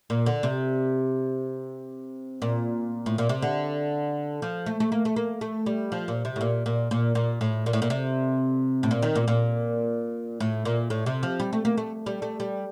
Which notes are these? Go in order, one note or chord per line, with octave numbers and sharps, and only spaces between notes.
A#2
D3
C3
A#2
A2
A#2
C3
D3
F3
A3
A3
A#3
A3
A#3
A3
G3
F3
A#2
C3
A2
A#2
A#2
A#2
A#2
A2
A#2
A2
A#2
C3
A2
A#2
D#3
A#2
A#2
A2
A#2
A2
C3
F3
G3
A3
A#3
A3
G3
A3
G3